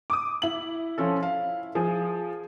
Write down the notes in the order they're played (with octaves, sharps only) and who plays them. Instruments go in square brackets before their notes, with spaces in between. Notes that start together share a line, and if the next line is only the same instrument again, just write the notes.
[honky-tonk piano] D6 D#6
E4 F#7
[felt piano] F3 C#4 A4
F5
[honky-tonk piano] F3 [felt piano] G#4